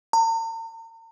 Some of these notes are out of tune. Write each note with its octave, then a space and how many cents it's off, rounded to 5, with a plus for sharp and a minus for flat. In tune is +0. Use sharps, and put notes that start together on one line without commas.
A#5 -45